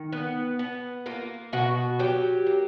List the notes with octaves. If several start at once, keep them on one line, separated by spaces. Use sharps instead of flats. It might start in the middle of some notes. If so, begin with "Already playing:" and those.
Already playing: D#3
B3
B3
A#3 F4
B2 F#4
F#3 G4
A#3